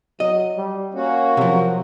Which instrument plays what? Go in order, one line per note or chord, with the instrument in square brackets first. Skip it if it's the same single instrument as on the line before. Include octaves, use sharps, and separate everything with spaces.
[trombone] F#3 [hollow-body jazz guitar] D#5
[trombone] G3
[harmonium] A#3 F#4 [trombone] C#4
[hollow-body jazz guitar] C3 F3 [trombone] F#3